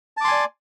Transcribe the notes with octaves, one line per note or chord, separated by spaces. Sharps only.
D5 G#5 A5 C6 D6